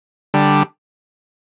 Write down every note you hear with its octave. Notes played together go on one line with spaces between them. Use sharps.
D3 G3